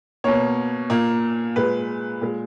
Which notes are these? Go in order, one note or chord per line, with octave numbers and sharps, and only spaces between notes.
B2 A#3 C#5
A#2 A#3
A#2 G#3 B4
A#2 G#3